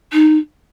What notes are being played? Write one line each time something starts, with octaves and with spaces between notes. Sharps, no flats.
D#4